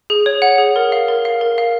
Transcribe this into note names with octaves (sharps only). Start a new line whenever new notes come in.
G#4
C#5
F#5
G#4
A#4
F5
A#4
F5
A#4
F5